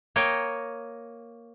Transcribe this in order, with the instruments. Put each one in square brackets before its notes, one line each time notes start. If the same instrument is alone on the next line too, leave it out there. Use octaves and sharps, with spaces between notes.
[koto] A#3 C#5 D#5 G5